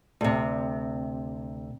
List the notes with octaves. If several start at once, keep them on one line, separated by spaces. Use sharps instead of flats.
D2 C3